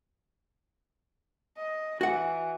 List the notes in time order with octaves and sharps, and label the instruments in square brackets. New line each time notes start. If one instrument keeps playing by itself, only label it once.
[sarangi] D#5
[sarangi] E3 [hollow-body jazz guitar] F#4 F#5